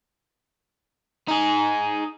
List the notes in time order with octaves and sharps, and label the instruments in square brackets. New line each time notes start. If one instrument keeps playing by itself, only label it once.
[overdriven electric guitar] D#4 G#4